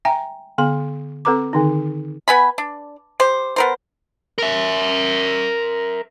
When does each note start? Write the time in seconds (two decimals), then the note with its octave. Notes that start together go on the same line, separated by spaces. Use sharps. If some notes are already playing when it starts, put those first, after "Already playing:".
0.05 E5 G5 G#5 A#5
0.58 D3 B3 C6
1.25 C4 A4 B4 A#5 D6
1.53 D3 D#3 D#4
2.28 B3 G#5 B5
2.58 D4
3.20 G4 C5
3.56 B3 A#4 C5
4.38 A#4 E5